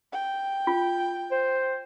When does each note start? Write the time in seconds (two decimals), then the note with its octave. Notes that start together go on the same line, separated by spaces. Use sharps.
0.12 G5
0.67 F4
1.32 C5